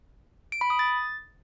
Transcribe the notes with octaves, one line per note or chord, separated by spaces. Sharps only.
D7
B5
D#6
A6